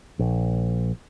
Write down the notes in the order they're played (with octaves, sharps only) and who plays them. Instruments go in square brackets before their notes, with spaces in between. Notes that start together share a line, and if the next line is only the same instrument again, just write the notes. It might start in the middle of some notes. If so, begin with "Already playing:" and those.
[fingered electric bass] A#1